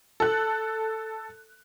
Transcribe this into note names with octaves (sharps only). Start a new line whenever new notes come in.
A4 F#6